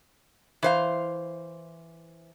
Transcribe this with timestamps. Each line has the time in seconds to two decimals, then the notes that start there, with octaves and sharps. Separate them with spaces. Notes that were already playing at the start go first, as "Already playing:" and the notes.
0.63 E3 C5 F5